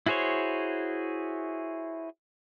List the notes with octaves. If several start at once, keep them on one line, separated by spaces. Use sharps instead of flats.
E4 F#4 G#4 C5 C#5